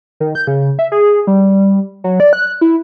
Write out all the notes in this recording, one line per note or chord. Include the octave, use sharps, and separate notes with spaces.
D#3
G6
C#3
E5
G#4
G3
F#3
D5
F#6
E4